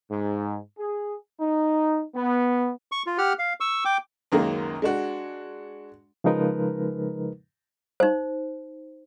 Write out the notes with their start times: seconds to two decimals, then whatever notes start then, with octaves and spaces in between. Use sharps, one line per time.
0.10 G#2
0.79 G#4
1.40 D#4
2.15 B3
2.92 C#6
3.07 F4
3.18 G4 F#5 F6
3.39 F5
3.60 C#6 E6
3.85 G5 D6
4.32 C#2 F#2 D#3 G#3 A#3
4.82 G#3 D4 F#4
6.24 C#3 F3 G#3 D#4 A#4 B4
8.00 D#4 C5